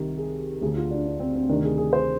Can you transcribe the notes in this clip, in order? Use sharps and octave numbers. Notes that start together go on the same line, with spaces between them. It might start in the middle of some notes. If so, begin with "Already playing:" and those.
Already playing: C2 C3 D#3
G#4
D2 D3 G#4
F4
D4
D4
C4
C4
D2 C3 D#3 D4
G#4
G#4
C5